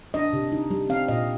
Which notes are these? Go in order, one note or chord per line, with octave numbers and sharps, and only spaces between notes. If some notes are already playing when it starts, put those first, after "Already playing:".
D4 D#5
C3
D#4
G3
C4 F5
A#2 D#5